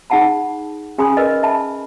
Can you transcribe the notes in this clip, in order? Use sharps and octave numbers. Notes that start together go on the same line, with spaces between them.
D#4 G#4 F#5 A5 B5
C#4 G#4 G#5 B5 C6 D#6
A#4 B4 D#5
E5 A5 B5